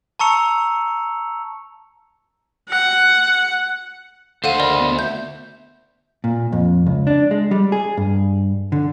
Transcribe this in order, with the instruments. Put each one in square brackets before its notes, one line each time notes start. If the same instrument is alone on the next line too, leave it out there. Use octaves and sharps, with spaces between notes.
[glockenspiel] A5 A#5 C#6 E6 C#7 F7
[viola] F#5
[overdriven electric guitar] D2 C5 [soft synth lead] A4 [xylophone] F5 F#5 D#7
[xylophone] A#4 D5 D#5 [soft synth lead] B5
[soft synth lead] B3
[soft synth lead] E5 [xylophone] G6
[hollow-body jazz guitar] A#2
F2
C#2
D4
G#3
G3
G#4
G2
D3